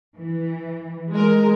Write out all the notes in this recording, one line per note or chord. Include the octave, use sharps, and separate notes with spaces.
E3
G#3 A#4